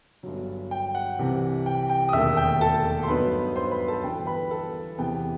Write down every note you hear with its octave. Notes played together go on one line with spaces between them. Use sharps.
G1 G2 F#3
G5
F#5
C2 C3 E3
G5
G5
D#6
E1 D#2 D#3 A3 E5 E6
G5 G6
A4 A5
C6
G2 F#3 B3 D#4 B4 B5
C5 C6
B4 B5
A4 A5
G1 G2 E3 G5
B4 B5
A4 A5
E2 C3 E3 B3 G5